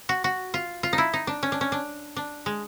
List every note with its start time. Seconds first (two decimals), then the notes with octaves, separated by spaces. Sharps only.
0.09 F#4
0.24 F#4
0.54 F4
0.83 F4
0.93 D#4
0.98 E4
1.13 D#4
1.27 D4
1.43 C#4
1.52 D4
1.61 C#4
1.72 D4
2.16 D4
2.46 G#3